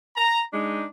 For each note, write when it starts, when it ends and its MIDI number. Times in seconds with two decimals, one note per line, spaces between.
0.17 0.41 82
0.53 0.85 56
0.53 0.85 62
0.53 0.85 63